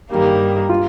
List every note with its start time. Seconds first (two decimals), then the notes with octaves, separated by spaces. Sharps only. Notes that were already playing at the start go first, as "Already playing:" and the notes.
0.10 G2 D#3 G3 A#3
0.69 F4